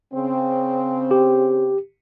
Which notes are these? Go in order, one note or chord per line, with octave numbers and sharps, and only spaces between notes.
C#3 C4
G4